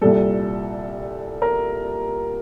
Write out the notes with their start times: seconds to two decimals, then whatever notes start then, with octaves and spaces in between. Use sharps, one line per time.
0.01 C2 A#2 G3 A4
1.42 A#4